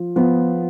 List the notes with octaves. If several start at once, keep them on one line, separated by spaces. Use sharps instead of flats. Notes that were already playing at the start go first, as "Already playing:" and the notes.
Already playing: F3
F3 B3